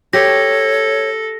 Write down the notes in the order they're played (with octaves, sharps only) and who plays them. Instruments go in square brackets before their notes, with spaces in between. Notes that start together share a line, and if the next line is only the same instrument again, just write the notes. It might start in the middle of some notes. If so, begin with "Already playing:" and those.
[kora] G4 [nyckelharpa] A4 [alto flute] C#5 [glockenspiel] A#6